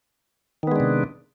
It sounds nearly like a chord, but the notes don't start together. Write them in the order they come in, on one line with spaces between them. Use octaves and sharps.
D#3 B3 G#3 D4 C3